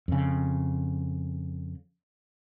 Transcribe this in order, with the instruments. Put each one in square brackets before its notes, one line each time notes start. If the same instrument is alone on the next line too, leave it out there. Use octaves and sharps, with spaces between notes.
[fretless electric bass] F2 C#3